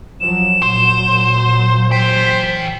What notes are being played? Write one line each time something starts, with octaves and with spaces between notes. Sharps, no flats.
F3 F#3 E7
A#2 F#3 C5
E3 C5 G5 B6